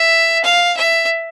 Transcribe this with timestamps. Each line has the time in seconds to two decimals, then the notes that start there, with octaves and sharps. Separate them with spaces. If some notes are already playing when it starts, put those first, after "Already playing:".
Already playing: E5
0.44 F5
0.76 E5